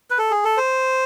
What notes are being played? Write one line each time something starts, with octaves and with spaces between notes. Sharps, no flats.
B4
A4
G#4
A4
C5